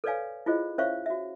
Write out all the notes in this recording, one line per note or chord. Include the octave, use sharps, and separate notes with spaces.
A4 B4 C#5 D5 F5 G#5
E4 F4 G#4 C5 D#5
C#4 C5 C#5 E5 F5 C#6
F#4 E5